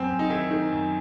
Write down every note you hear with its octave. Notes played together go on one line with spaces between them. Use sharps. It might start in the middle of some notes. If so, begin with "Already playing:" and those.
Already playing: F#2 C4
F#2
D#4
D#3 E4
D#3
F#2